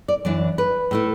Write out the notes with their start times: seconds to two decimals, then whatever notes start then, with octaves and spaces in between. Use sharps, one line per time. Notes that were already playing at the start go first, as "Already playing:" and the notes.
0.08 D5
0.25 F#2 E3 D4 D5
0.58 B4
0.91 A2 A3 E4